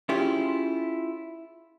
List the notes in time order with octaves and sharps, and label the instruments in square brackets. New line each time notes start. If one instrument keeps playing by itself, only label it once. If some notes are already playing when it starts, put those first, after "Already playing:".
[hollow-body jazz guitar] C#4 E4 F4 G4 G#4